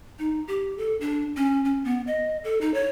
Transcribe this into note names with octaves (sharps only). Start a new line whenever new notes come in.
D#4
G4
A4
D4
C#4
C#4
B3
D#5
A4
D#4
C#5